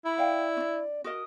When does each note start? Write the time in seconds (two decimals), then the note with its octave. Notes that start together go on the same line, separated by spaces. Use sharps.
0.05 E4 B5
0.18 D5 F5 G5
0.57 C#4 D4
1.04 F#4 A#4 D#5 D#6